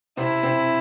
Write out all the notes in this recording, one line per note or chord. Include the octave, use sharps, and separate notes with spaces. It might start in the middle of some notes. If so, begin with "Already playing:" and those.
C3 C4 E4
C3 C4